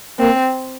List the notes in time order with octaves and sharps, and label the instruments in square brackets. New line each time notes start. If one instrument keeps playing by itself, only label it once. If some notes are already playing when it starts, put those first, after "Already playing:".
[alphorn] A#3 [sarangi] C4